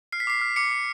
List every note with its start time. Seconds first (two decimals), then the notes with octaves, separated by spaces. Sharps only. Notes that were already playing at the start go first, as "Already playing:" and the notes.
0.12 F6 C7
0.20 B6
0.27 D6 C7
0.41 F6
0.56 D6 C#7
0.71 D6